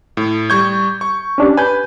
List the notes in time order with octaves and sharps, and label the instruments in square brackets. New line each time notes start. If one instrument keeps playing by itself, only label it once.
[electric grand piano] A2
[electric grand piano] G3 C#6 G6 [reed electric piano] G#6
[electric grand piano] C#6
[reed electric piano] C#4 D4 G4
[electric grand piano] B4 [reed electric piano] G#5 G6